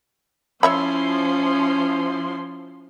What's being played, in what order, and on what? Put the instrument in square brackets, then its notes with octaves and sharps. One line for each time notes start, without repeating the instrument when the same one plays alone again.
[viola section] F3 E4 C6 [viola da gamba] C#4 [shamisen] C#5 E5 B5